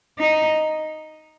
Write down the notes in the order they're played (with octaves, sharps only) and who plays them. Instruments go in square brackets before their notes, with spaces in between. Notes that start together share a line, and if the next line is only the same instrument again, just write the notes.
[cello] D#4